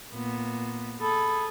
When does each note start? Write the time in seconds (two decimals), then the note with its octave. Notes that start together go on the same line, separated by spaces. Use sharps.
0.13 A#2 B3
1.01 G#4 A4 B5